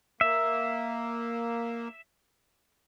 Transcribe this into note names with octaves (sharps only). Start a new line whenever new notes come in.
A#3 E5